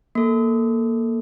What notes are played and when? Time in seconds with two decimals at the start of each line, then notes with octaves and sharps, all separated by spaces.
0.15 A#3 A4